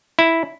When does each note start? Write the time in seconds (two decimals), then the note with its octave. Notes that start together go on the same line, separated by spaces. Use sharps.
0.19 E4